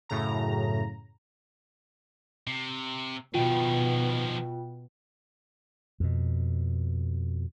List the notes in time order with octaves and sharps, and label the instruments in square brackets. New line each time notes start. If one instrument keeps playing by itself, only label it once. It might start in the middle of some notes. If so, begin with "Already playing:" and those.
[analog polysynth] F#2 A2 C#3 A#5
[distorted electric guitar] C3
[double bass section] B2 [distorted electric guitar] D#3 F3 [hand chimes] F4 G5
[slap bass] F2 B2